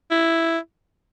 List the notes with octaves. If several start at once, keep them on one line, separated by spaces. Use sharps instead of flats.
E4